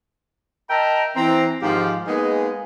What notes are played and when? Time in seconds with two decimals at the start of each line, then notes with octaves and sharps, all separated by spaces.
0.70 A#4 D#5 E5 G5 A5 A#5
1.17 E3 C4 A#5
1.63 G#2 D#3 F3 G4 F5
2.07 G#3 A#3 B3 D#4 G#4